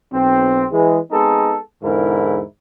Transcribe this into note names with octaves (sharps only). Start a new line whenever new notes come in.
B1 C4
E3 G#3
G#3 B3 C4 D#4 A4
E2 G#2 D3 E4 A#4